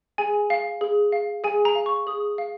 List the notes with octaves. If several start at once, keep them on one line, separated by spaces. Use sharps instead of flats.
G#4 G#5
F5
G#4
F5
G#4 G#5
A#5
F5
C#6
G#4 D#6
F5